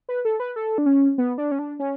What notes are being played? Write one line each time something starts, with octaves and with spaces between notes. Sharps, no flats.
B4
A4
B4
A4
D4
C#4
B3
D4
C#4
D4
C#4